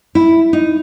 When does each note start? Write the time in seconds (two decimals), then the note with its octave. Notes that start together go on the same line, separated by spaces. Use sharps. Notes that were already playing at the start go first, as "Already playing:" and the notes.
0.15 E4
0.53 D#4